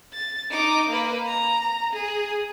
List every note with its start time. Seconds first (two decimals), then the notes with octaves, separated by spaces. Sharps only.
0.13 A6
0.50 D#4 D6
0.89 A#3 B4
1.26 A#5
1.93 G#4